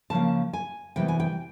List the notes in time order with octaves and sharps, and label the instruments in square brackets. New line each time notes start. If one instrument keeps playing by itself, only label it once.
[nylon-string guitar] C#3 F3 A#3 A5
G#5
C3 E3 G3 B3 G5
G#5
G5